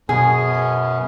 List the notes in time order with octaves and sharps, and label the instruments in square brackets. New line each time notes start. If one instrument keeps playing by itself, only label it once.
[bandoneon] F#2 B3 C#4 [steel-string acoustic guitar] B2 [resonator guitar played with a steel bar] G#4